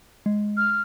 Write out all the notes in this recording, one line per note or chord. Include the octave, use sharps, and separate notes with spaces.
G#3
F6